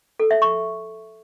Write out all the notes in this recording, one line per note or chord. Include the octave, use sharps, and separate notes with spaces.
A4
E5
C#6